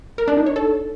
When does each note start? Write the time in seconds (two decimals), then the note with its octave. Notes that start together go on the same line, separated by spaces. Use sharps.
0.18 A#4
0.28 D4
0.37 D#4
0.46 C#5
0.56 A4